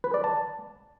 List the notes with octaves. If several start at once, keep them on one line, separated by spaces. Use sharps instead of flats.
B4
D5
A5